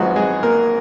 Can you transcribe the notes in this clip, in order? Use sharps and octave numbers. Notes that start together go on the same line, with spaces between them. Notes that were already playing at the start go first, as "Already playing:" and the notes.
Already playing: G#1 G#2 F3 F#3 G#3 B3 F#4
G#3 G#4
A#3 A#4